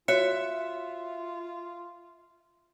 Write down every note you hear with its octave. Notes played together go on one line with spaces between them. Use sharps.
F4 F#4 C#5 E5 F#6 C#7